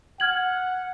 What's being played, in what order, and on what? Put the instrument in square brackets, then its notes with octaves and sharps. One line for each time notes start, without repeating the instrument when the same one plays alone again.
[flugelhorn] F#5 [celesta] F6 G#6 F#7